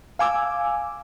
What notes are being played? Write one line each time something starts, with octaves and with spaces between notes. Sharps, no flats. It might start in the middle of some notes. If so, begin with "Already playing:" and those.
F5 G#5 D6 E6